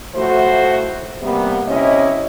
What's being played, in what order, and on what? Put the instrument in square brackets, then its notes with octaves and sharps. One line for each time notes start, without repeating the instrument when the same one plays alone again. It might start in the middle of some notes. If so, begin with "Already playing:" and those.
[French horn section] A2 F3 A3 F#4 C5
C3 G3 A#3 B3
C3 C#4 E4 C#5 D#5